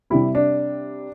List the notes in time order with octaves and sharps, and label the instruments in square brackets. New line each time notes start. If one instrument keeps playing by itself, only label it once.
[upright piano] C3 G3 E4
D4